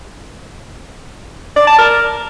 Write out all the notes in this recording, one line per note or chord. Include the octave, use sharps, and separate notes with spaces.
D5
A5
A#4